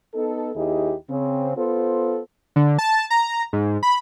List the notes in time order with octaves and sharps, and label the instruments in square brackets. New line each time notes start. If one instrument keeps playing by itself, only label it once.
[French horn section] B3 D#4 A4
D#2 D#4 E4 G4 G#4
C#3 C4
B3 F4 A4 C5
[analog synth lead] D3
A5
A#5
G#2
B5